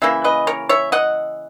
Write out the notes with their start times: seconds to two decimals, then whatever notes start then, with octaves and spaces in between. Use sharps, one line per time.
0.02 C#3 E3 A#3 E5
0.24 B4 D#5
0.47 A#4 C#5
0.69 C#5 E5
0.92 D#5 F#5